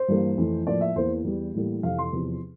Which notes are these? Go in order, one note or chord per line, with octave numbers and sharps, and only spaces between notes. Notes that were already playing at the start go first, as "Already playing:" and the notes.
Already playing: C5
G2 E3 G3 A#3
F2 E3 A3
A2 F3 A#3 D5
E5
E2 E3 A#3 C5
E2 E3 G3
A2 E3 G3 A#3
F2 C3 E3 F5
C6
E2 C3 F3